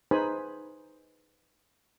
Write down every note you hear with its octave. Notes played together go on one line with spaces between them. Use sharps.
D#4 G#4 B4 C5 G#5 B5